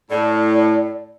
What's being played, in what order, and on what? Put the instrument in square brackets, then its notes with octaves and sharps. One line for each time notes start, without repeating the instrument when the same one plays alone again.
[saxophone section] A2 [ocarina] D5